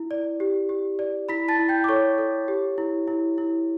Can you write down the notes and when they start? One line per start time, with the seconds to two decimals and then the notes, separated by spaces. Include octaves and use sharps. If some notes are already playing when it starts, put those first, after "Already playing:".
Already playing: E4
0.11 D5
0.40 G4
0.69 G4
0.99 D5
1.29 E4 B5 B6
1.48 A5 A6
1.59 E4
1.69 G5 G6
1.84 D6
1.88 A4 C#5 C#6
2.18 A4
2.48 G4
2.78 E4
3.08 E4
3.38 E4